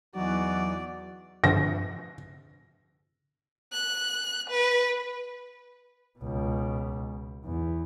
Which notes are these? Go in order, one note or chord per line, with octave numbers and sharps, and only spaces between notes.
E2 E3 F#3 D#4 F#4 D5
G2 D3 F3 A#6
F#6
B4
C#2 B2
E2